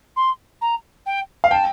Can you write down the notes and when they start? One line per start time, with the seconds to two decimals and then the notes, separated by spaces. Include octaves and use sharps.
0.16 C6
0.61 A#5
1.06 G5
1.44 F5
1.51 G5 A5